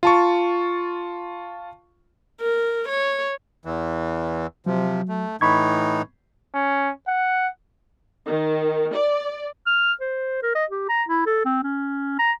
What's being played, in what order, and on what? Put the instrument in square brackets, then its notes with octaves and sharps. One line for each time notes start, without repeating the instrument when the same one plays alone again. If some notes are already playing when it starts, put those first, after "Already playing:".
[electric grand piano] F4 A5 C#6
[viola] A#4
C#5
[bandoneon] E2 E3
[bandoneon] C3 F3 [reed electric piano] F#3
[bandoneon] A3
[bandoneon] A2 E3 D#4 [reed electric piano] B5 C#6 G#6
[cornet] C#4
F#5
[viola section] D#3
D5
[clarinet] F6
C5
A#4
D#5
G4
A#5
E4
A4
C4
C#4
A#5